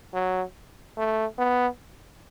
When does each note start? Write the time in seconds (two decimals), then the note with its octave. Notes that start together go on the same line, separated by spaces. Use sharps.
0.13 F#3
0.97 A3
1.38 B3